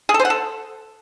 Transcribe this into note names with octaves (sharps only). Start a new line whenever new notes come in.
G#4
A4
C5
F#5
A4